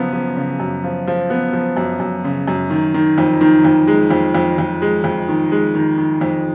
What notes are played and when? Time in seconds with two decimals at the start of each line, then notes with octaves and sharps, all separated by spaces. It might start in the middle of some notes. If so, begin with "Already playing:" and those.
Already playing: F#2 C#3 F3 B3
0.13 F3
0.36 C#3
0.60 F#2
0.84 F3
1.07 F3
1.30 B3
1.53 F3
1.77 F#2
2.00 F#2
2.24 C#3
2.48 F#2
2.70 D#3
2.94 D#3
3.18 F2
3.41 D#3
3.65 F2
3.87 G#3
4.11 F2
4.35 F2
4.58 F2
4.82 G#3
5.04 F2
5.28 D#3
5.52 G#3
5.75 D#3
5.98 D#3
6.21 F2